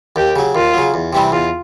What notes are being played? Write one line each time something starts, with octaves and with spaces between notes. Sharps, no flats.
D#2 G4
C#3 F#3
D#2 F4
C#3 F#3
E2
C3 E3 G3 C4
E2 F4